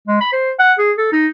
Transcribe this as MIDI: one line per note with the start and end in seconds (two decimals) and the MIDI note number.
0.08 0.19 56
0.21 0.32 83
0.33 0.51 72
0.59 0.73 78
0.78 0.92 68
0.98 1.11 69
1.12 1.27 63